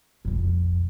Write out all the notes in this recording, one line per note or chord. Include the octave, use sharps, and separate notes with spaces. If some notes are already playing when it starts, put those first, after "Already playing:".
B1 F2